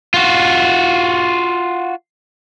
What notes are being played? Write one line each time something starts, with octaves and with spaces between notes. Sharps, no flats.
F4 F#4